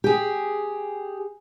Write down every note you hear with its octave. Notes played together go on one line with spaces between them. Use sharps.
G4 G#4